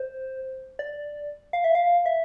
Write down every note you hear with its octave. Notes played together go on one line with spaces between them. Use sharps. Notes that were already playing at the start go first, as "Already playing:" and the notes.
Already playing: C5
D5
F5
E5
F5
E5